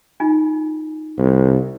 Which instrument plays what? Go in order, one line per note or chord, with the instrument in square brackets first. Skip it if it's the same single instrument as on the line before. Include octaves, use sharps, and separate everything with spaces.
[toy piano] D#4 F4 G#5
[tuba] C2